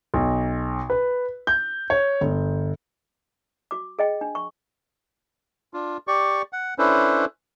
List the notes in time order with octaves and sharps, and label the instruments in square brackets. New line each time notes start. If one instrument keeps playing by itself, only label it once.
[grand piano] B1
B4
G6
C#5
G1
[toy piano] F#4 D6
G#4 D#5 G5
D4
C#6
[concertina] D4 F4
G4 D5 C#6
F#5
C#4 D4 E4 A4 B4 C5